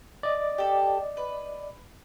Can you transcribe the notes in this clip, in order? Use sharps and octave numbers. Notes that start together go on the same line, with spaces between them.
D5 D#5
G4 A4
B4